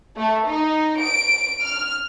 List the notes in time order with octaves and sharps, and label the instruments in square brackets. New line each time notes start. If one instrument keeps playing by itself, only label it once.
[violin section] A3
D#4
D7
F6